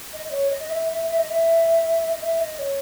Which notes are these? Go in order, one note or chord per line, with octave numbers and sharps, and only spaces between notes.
D#5
D#5
C#5
D#5
D#5
E5
E5
E5
D#5
E5
D#5
E5
D#5
C#5